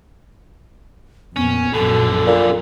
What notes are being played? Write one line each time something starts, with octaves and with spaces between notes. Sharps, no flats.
F2 A#2 B3 C#4
A#1 F#2 B2 D3 A4
A#2